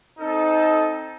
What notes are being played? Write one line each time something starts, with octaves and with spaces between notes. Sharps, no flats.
C4 D#4 A4